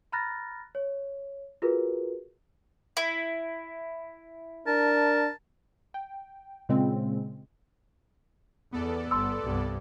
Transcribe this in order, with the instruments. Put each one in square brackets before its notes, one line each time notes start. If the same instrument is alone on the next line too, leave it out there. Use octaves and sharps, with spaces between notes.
[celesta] A#5 B5 F6 F#6 A6 A#6
C#5
F4 F#4 G#4 A#4 B4
[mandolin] E4
[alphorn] D4 [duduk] A#4 [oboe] A5
[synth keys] G5
A#2 C#3 G#3 C4
[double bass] E2 [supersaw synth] B3 A4 D5
[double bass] G1 [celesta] C6 E6
[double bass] C2 G2